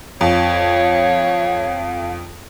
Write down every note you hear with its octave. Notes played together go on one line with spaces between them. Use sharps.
F2 C#5 F5